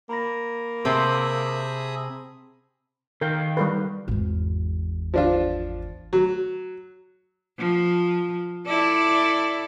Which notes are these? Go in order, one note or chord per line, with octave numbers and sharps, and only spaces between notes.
A#3 A#5 B5 A#6
C3 C4 G#4 E5 A5 C6 D#6 F#7
D#3 A#4 F5 G5
G3 A#4 B4
G#1 E2
F3 D4 F4
F#3
F3
E4 A4 D5